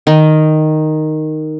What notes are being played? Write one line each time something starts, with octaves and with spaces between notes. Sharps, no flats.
D#3